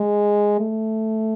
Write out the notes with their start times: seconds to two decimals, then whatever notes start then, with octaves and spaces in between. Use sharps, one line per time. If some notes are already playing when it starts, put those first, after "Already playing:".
Already playing: G#3
0.60 A3